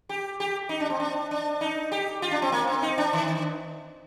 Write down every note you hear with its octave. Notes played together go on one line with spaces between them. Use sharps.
G4
G4
D#4
D4
C4
D4
D4
D#4
G4
F4
D4
C4
A#3
C4
D#4
D4
D#3